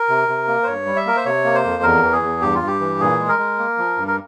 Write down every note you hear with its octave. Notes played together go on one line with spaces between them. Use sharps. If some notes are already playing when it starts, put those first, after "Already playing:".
Already playing: A#4
C3
C3
A#3
C5
G2 C#5
G3
E5
A#3 A#4
C5
C3 C#5
A#3
C5
F2
E2 A#4
E3
G#4
E2
G2 G4
F4
G2
G4
E3
A#2 G#4
G#3
A#4
G#3
A#3
F3
G2
A#4